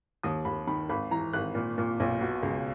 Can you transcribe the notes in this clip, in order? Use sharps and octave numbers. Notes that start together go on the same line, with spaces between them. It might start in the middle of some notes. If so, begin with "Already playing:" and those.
D#2 D#6
D#2 B5
D#3 B5
G#1 B5
E3 A#5
G#1 F#6
A#2
A#2
B1
B2
C#2